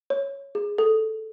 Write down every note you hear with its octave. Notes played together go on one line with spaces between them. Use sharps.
C#5
G#4
A4